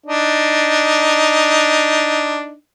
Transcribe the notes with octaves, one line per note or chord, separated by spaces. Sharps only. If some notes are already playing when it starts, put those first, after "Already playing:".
D4 D#4